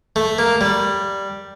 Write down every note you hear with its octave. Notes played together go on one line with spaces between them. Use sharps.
A3
A#3
G3